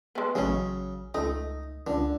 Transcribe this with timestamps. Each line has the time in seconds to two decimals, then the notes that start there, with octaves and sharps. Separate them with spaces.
0.15 G#3 B3
0.35 A1 C#3 F#3 C#4 G#4
1.14 C#2 A3 D#4
1.87 C#2 D3